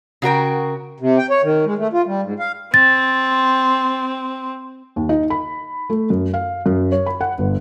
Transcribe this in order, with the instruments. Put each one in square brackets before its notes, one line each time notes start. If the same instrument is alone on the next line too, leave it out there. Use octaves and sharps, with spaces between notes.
[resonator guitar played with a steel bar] C#3 F#4 A#4 G5
[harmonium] C3
G5
C#5
D#3
G#3
A3
F4
G3
G#2
F5
[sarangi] C4 [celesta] A6
[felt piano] D#2
D#4
B5
A3
F#2
F5
F#2
C#5
B5
F#5
G1